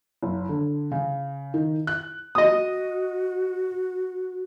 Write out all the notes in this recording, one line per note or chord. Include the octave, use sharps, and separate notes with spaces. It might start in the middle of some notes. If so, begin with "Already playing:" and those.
F#1
D3
C#3
D#3
F#6
F#4 D#5 D#6